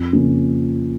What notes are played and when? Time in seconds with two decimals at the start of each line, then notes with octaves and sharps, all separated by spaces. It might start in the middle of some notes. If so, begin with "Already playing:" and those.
Already playing: F2
0.13 C#3 F3 A#3 C#4